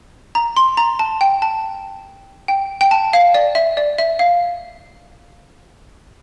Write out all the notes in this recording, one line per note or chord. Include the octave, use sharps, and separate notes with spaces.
A#5
C6
A#5
A5
G5
A5
G5
G5
A5
F5
D5
E5
D5
E5
F5